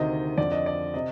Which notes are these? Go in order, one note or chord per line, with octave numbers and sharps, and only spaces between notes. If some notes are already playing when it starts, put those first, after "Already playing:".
Already playing: D2 C3 D#3 D#5
F2 D3 D5
D#5
D5
C3 D#5